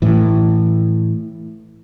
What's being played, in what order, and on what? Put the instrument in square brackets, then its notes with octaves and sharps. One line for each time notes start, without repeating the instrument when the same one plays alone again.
[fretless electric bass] A2 E3